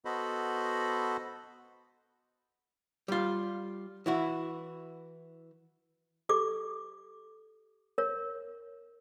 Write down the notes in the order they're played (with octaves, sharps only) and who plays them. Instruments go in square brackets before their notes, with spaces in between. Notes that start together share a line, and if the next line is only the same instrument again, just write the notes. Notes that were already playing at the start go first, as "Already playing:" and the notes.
[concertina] B3 F#4 A4 C5 D#5 B5
[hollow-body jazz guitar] G3 F4
E3 E4 F#4
[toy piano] G4 A4 D6
A#4 C#5